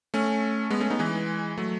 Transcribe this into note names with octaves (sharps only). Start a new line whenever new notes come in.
A3 C#4
G#3 B3
A3 C#4
B3 D#4
E3 G#3
F#3 A3